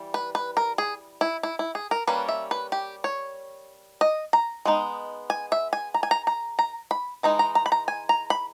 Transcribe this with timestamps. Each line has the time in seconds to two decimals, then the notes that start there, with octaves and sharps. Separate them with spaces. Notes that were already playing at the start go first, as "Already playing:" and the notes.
Already playing: E3 G3
0.14 B4
0.35 B4
0.57 A#4
0.78 G#4
1.21 E4
1.43 E4
1.59 E4
1.75 G#4
1.91 A#4
2.07 G3 A#3 C#4 B4
2.28 E5
2.51 B4
2.72 G4
3.04 C#5
4.01 D#5
4.33 A#5
4.65 G#3 B3 D#4
5.30 G#5
5.52 E5
5.73 G#5
5.94 A#5
6.03 G#5
6.11 A#5
6.27 A#5
6.59 A#5
6.91 B5
7.23 E3 G#3 D#4 A#5
7.39 A#5
7.55 A#5
7.66 B5
7.72 A#5
7.88 G#5
8.09 A#5
8.30 B5